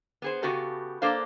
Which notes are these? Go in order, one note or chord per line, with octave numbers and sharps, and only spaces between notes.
B3 G#4 C5
C#3 B3 F#4 G4 A4
A#3 D4 A4 C5 F5